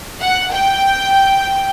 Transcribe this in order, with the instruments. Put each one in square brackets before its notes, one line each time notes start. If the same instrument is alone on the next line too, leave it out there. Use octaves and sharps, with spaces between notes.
[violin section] F#5
G5